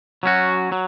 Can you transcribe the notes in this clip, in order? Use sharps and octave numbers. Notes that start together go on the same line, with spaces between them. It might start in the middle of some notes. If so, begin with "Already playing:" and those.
F#3 C#4 F#4
F#3